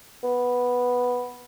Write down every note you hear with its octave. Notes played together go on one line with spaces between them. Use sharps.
B3